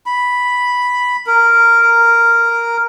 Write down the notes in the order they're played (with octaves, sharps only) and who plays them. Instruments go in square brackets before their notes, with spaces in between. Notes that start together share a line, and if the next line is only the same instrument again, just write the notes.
[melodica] B5
A#4